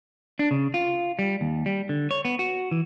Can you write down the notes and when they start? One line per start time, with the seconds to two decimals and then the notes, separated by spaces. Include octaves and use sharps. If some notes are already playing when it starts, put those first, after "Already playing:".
0.39 D4
0.51 C#3
0.74 F4
1.19 G3
1.41 D#2
1.66 G3
1.89 D3
2.11 C#5
2.25 B3
2.39 F#4
2.71 E3